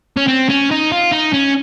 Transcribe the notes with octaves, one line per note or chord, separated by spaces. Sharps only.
C#4
C4
C#4
D#4
F4
D#4
C#4